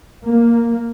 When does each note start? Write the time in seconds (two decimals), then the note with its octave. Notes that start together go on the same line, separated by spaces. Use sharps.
0.24 A#3